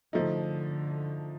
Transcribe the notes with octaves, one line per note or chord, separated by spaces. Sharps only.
D3 F3 A3 D#4